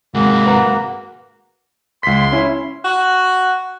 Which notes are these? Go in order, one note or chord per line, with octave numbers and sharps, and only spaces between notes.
G#2 C3 A#3 F#4
B4 F#5 A#5
C#2 C6 B6
C#4 E4
F#4